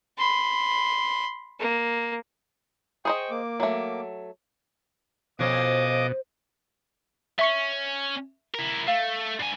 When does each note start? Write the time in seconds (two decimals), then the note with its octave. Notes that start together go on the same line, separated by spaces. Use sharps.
0.18 B5 C6
1.59 A#3
3.05 G#4 C5 D#5 G5 C#6
3.31 A#3 D6
3.60 F#3 A3
5.39 F2 B2 F3 C#4 C5 D#5 D6 D#6
7.39 C#4 E5 C#6 C#7
8.54 E4 A#4
8.88 A3 F5
9.39 G2 G#5